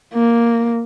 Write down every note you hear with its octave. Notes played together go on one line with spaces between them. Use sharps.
A#3